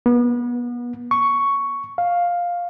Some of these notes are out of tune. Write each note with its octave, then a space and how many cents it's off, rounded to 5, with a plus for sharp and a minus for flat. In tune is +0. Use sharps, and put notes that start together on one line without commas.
B3 -30
C#6 +5
F5 +5